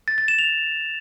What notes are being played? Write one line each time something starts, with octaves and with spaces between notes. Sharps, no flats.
A6
A6
E7
F7